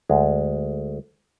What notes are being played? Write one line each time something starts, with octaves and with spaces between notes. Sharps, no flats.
D2 G#3